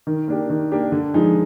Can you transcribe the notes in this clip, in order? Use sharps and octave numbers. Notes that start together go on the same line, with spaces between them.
D#3
A#3 D4 G4
D#3
A#3 D4 G4
D3
F3 G#3 D#4 G#4